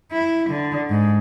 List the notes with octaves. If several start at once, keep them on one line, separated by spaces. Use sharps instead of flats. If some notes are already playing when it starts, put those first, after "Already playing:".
E4
D3
G#2